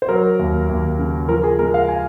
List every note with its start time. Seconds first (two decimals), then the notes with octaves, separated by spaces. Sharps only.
0.02 C5
0.08 F#3 A#4
0.39 D#2
0.69 D#2
0.99 C#3
1.29 F3 A#4
1.44 G#4
1.59 G#3 A#4
1.74 F5
1.88 G#5